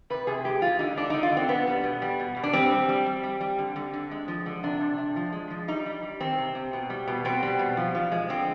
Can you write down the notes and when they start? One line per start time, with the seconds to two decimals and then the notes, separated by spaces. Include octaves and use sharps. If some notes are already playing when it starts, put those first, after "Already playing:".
0.10 C3 B4
0.27 C3 G#4
0.45 G#3 G4
0.62 G#3 F4
0.79 D3 D#4
0.97 D3 D4
1.10 D3 D#4
1.23 F4
1.32 D3 C4
1.49 B2 B3
1.67 G3
1.84 B2
2.02 G3
2.20 B2
2.37 B2
2.44 D4
2.53 G3 C4
2.71 G3
2.89 G3
3.06 G3
3.23 G3
3.41 G3
3.59 D3
3.76 D3
3.94 D3
4.11 G#3
4.28 F3
4.46 D3
4.63 C3 D4
4.80 C3
4.98 C3
5.16 F3
5.32 G#3
5.50 F3
5.68 G3 D#4
5.86 G3
6.03 G3
6.20 D#3 C4
6.38 C3
6.55 C3
6.73 B2
6.90 G3
7.07 B2
7.25 B2 C4
7.42 G3
7.59 B2
7.77 F3
7.95 F3
8.12 G#3
8.29 D3 C4